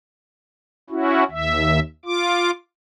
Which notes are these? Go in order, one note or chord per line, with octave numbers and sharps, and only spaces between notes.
C#4 E4 F#4
D#2 E5
F4 D6